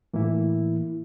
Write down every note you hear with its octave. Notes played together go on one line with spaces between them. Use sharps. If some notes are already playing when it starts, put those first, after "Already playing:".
A2 E3 A#3 E4